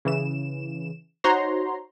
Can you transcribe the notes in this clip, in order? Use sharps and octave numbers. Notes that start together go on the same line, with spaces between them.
C#3 E3 E7
D#4 F#4 C5 C#5 A#5 C6